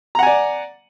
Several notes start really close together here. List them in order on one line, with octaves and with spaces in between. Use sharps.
A#5 F#5 G#5 D5